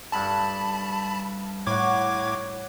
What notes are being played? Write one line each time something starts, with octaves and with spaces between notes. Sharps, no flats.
G2 A4 A5 B5
A2 C#5 F#5 D6 G#6